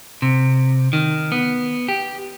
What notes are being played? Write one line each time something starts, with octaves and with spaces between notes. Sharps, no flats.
C3
D#3
B3
G4